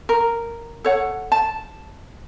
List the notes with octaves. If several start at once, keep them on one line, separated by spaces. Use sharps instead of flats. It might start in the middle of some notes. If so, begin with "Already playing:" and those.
A#4
A4 C#5 F#5
A5